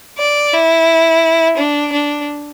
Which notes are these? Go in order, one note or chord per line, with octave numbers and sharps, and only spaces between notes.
D5
E4
D4
D4